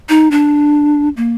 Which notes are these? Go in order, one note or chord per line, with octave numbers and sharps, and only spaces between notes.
D#4
D4
A#3